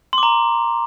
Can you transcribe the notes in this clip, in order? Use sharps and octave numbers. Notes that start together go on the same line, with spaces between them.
C6
D6
A#5